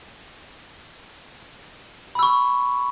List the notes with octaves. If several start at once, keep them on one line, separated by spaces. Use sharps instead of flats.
B5 C#6 E6